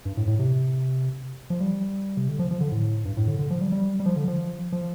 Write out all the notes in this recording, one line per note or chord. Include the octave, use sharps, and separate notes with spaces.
G2
A2
A2
C3
F3
G3
C3
D3
F3
F3
D3
A2
G2
A2
D3
D3
F3
G3
G3
G3
F3
D3
F3
F3